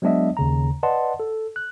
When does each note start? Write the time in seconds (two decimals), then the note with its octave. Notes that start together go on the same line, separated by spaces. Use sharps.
0.02 F#3 G#3 B3 D4 D#5 E5
0.37 D#2 C#3 A#5
0.83 B4 D5 D#5 F#5 A5 C6
1.20 A4
1.56 F#6